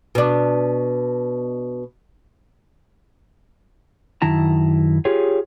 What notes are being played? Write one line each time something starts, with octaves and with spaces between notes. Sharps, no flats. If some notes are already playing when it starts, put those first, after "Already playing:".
B2 D4
F#2 D#3 E4 A5 A#5
F4 G4 G#4 C#5